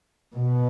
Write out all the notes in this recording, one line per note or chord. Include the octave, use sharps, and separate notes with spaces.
B2